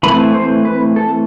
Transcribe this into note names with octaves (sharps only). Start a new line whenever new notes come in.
E3 A3 C4 B5
C5
B4
A4